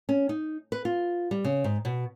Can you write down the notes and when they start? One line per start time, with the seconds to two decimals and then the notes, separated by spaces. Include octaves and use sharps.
0.09 C#4
0.29 D#4
0.72 B4
0.85 F4
1.31 G3
1.44 C#3
1.64 G#2
1.85 B2